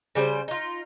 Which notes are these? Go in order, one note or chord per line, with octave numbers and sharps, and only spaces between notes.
C#3 G3 A#4 C5
D#4 F4